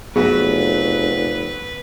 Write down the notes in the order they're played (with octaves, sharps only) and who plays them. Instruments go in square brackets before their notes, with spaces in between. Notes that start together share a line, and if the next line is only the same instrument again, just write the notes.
[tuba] F1 [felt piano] F#3 B3 F#4 [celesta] G#4 [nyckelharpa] B4